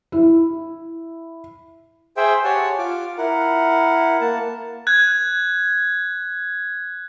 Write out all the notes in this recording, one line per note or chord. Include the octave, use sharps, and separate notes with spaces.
E4
G#4 C5 E5 G5
G4 C#5 F#5 G#5 A5
F4 D6
E4 A#4 F#5
A#3 A5
F#6 G#6